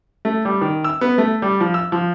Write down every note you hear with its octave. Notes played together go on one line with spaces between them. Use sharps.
A3
G3
D#3
E6
B3
A3
G3
F3
E6
F3